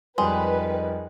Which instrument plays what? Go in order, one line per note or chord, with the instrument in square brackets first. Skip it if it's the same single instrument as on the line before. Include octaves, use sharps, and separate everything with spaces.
[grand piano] F2 G3 [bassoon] D#3 [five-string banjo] G#3 [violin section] B4